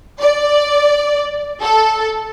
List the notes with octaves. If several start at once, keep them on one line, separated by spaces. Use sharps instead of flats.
D5
A4